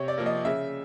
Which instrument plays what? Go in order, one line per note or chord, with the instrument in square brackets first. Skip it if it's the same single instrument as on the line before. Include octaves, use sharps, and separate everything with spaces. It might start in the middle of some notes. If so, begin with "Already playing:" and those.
Already playing: [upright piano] C3 C#5
D5
F3 A#3
D#5
C#3 E5